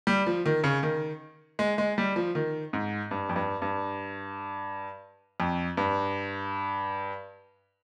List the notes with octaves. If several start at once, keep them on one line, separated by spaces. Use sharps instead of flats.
G3
F3
D#3
C#3
D#3
G#3
G#3
G3
F3
D#3
G#2
G2
F2
G2
G2
F2
G2